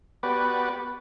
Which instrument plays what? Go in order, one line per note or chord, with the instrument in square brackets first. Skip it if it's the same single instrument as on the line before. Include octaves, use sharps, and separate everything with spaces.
[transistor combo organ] B3 F#4 G4 B4 D5